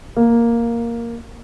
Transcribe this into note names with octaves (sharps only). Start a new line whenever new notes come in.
A#3